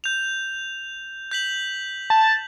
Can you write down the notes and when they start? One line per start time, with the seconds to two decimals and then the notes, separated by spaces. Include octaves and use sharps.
0.04 G6 F7
1.31 G6 B6 F#7
2.10 A5